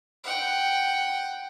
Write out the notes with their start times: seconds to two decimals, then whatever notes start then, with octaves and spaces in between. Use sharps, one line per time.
0.24 F#5 G5